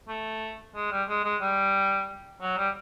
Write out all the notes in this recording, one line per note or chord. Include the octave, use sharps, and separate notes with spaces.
A3
G#3
G3
G#3
G#3
G3
F#3
G3